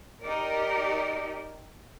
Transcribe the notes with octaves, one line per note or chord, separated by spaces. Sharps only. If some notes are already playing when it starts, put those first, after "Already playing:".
D#4 G4 A#4 D5